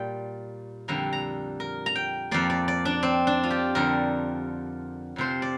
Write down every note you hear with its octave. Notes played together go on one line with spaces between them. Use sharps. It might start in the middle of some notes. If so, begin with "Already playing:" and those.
Already playing: A#2 G3 A#3 G5
F2 D3 G3 A#3 A#5
A#5
A#4
A#5
G5
F2 F3 A#3 D5
D5
D5
D4
C4
D4
F4
G4
F2 D3 G3 A#4
F2 C3 F3 C5
D5